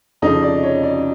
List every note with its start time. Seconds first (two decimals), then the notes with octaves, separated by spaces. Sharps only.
0.22 F2 C#3 F3 D#4 D#5
0.43 D5
0.63 C#5
0.83 D5